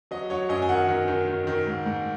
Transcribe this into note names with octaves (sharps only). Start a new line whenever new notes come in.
F#3 D#5
F#3 C#5
F#2 D#5
G#5
D#3 F#5
D#3
D#3
D#3
D#3
G#2
G#2